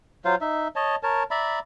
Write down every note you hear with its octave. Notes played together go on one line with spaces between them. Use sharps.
F#3 F4 C5 F5
D#4 E5
C#5 D#5 A5
A#4 C#5 A5
D5 E5 A#5 B5